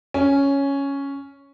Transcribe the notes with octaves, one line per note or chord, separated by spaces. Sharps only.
C#4